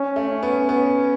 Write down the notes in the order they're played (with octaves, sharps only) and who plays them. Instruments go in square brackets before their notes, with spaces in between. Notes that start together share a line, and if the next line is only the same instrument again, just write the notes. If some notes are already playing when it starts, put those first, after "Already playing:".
Already playing: [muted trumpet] C#4
[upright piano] A3
[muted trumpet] C#4
[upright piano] B3
B3